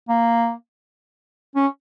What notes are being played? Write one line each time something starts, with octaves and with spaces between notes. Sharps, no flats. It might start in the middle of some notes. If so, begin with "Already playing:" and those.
A#3
C#4